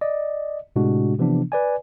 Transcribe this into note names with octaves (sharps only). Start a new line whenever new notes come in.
D5 D#5
A2 C3 G#3 D4 F#4
C3 E3 F3 B3 D4
B4 D5 G#5